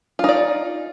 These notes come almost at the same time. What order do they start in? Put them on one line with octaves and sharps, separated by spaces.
F4 D#4 D5